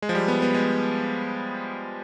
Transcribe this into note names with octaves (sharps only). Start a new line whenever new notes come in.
G#3
F3
G3
B3
B3
G#3